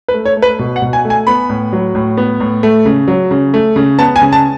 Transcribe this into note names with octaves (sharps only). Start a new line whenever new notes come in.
B4
A3
C#5
A3
B4
B2
F#5
B2
G#5
A3
G#5
B3 B5
A2
F#3
A2
B3
A2
A3
C#3
F#3
C#3
A3
C#3
B3 A5
G#5
C#3
A5